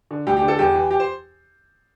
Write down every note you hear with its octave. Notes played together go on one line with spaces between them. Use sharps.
D3
D2 G4
G4
D3
A4
E2 G4
E3
G4
C5